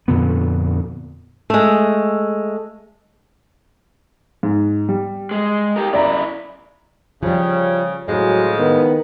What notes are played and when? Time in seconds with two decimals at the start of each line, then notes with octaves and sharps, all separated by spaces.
0.08 F2 A#2 D3 B3
1.50 G#3 A3
4.43 G#2
4.89 G3
5.31 G#3
5.76 G4 A#4
5.93 C#3 E4 D5 E5 A#5
7.23 C#3 F3 G3
8.08 A2 C#3 F3 F#3 G#3
8.59 D#3 B3